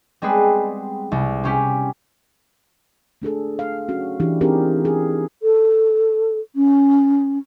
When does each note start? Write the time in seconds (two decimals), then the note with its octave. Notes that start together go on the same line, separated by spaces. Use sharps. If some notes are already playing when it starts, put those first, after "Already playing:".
0.22 G3 G#3 B3 C4 G#4 B4
1.12 C2
1.44 C4 C#4 G4 B6
3.22 A3 D4 G#4 A4
3.59 F5
3.89 C#4 F#4
4.20 E3 D4 E4 G4
4.41 C4 D4 D#4 G4 G#4 A#4
4.85 G#4
5.43 A4
6.56 C#4